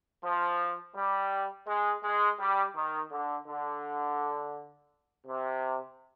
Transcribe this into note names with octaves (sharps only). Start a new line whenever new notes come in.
F3
G3
G#3
G#3
G3
D#3
D3
D3
C3